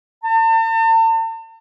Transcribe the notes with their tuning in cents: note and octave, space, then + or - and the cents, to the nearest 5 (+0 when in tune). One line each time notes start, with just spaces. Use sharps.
A5 +45